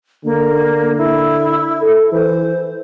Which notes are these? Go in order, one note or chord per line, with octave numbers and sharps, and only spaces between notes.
D3 A#3
E4
A4
E3 C5